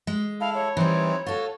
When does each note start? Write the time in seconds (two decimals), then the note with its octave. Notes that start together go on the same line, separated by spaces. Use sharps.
0.07 G#3
0.40 E4 A4 F5
0.54 C#5
0.77 E3 G3 C4 D#4 E4
1.26 F4 F#4 A4